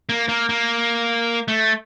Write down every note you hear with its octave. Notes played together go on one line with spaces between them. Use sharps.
A#3
A#3
A#3
A3